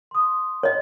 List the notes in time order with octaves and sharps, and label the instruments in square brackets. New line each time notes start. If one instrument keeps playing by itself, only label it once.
[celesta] C6 D#6
[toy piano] C#5 D#5